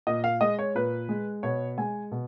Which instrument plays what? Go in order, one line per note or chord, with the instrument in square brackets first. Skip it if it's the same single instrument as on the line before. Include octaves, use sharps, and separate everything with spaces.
[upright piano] A#2 D#5
F5
G#3 D#5
C#5
A#2 B4
G#3
B2 C#5
G#3 G#5
B2